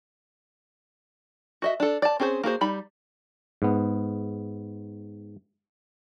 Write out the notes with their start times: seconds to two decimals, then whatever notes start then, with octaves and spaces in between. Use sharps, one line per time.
1.62 F#4 D#5 E5
1.80 D4 A4
2.02 D5 A5
2.20 C4 C#4 G#4 B4 C5
2.43 A#3 F#4 G#4 C5
2.61 G3 D#4 B5
3.62 G#2 B3